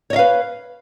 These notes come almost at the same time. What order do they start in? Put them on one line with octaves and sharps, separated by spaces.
C#5 D#5 F5 B4